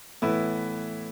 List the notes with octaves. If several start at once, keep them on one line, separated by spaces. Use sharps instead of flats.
A2 E3 B3 E4 B4